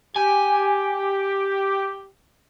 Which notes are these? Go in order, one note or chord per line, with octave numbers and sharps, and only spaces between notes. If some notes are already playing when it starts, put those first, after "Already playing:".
G4 G#5